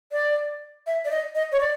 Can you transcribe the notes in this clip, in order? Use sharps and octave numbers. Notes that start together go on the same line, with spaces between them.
D5
E5
D5
D#5
D#5
C#5
D5